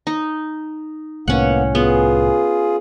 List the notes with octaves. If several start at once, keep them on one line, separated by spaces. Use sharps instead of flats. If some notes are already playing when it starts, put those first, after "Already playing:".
D#4
C2 A2 A#3 B3 C#4 F#5
B3 F4 G#4